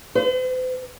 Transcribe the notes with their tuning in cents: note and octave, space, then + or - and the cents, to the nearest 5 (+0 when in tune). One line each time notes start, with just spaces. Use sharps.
C5 -45